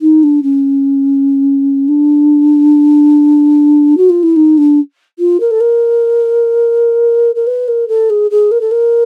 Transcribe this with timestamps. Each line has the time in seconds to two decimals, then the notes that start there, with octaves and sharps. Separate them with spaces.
0.01 D#4
0.23 D4
0.43 C#4
1.88 D4
3.97 F#4
4.10 F4
4.23 E4
4.36 D#4
4.58 D4
5.19 F4
5.40 A#4
5.51 A4
5.60 A#4
7.35 A#4
7.47 B4
7.68 A#4
7.88 A4
8.10 G#4
8.31 G#4
8.51 A#4
8.61 A4
8.71 A#4